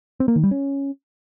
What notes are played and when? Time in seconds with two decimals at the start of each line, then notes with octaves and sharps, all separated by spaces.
0.20 C4
0.28 A#3
0.36 D#3
0.43 G3
0.51 C#4